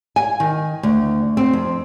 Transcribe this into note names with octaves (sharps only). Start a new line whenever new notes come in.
G#5
D#3
D2
C4
F2